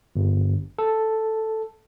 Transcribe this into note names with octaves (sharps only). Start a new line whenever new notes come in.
G1
A4